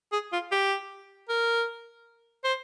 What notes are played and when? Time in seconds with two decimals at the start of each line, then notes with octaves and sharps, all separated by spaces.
0.12 G#4
0.33 F4
0.52 G4
1.29 A#4
2.44 C5